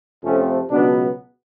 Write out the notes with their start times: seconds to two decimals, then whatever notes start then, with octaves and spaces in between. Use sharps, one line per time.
0.23 F2 C3 F3 A3 C4 C#4
0.69 C#2 B2 F#3 B3 D4